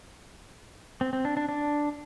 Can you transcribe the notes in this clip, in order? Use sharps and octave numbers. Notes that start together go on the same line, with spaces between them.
C4
C4
D4
D4
D4